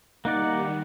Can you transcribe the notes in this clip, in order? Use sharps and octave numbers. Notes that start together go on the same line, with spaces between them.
D#3 G3 A#3 D#4 D5 F#5